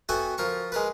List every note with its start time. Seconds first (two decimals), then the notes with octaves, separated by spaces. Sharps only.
0.09 B3 F#4 A4 E5 G5 G#5
0.38 F3 A#4 C#6
0.72 G#3 A#4 B4